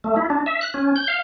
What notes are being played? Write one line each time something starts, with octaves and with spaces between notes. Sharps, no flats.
A3
E4
D4
E5
F#6
C#4
G6
F5